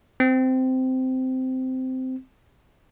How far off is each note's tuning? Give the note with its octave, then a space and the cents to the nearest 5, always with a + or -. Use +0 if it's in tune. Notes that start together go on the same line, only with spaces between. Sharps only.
C4 -15